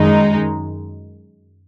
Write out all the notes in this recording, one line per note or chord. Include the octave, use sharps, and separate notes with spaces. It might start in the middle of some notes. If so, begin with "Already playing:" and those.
Already playing: F#2 D#3 G#3 D#4